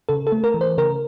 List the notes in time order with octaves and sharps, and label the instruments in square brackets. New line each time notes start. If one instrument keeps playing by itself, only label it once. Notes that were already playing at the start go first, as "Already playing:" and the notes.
[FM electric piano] C#3 A4
A4
A3
A#4
E3
C5
C#3 A#4